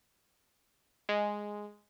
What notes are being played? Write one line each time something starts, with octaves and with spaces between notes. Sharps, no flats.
G#3